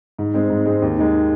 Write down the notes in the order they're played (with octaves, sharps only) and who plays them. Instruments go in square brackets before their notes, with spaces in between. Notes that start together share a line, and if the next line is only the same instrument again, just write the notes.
[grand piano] G#2
G#3 C4
G#2
G#3 C4
D#2
D#3 G#3